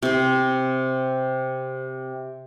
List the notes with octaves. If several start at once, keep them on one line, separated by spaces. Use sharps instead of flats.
C3 C4